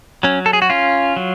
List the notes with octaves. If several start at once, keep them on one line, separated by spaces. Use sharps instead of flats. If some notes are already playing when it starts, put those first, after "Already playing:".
F#3 C#4
A4
G#4
F#4
C#4 F4
F#3